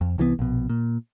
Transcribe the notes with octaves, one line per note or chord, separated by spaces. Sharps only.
F2
C2 E3 G3 B3
A#1 B2
A#2